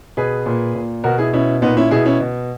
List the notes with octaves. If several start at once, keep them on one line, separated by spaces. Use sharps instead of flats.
B2 G#4 B4
A#2
A#2
B2 F#4 A#4
E4 G#4
B2 C#4 E4
A#2 B3 D#4
C#4 E4
B2 E4 G#4
C#4 E4
B2